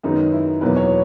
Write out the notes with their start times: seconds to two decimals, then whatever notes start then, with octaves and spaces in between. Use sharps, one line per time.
0.03 F#2 D#3 G#3 B3 D#4
0.32 E4
0.61 E2 B2 F#3 A#3 B4
0.76 C#5